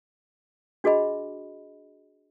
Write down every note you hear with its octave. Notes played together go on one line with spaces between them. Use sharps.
D4 F#4 G#4 D#5 B5